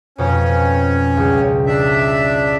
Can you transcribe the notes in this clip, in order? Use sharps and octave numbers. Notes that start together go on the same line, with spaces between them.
F2 B2 C#4
C#2 G3
D4 E5